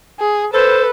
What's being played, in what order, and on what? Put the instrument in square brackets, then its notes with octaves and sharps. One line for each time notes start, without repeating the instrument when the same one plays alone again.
[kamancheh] G#4
[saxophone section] A4 [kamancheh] B4 [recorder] C5